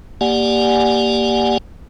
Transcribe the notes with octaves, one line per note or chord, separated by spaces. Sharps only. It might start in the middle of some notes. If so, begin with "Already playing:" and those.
A#3 G4 D5 F#5 G#5